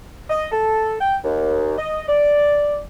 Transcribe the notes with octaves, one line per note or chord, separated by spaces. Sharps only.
D#5
A4
G5
D#2
D#5
D5